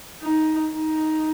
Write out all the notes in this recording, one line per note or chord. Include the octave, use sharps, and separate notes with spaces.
D#4
D#4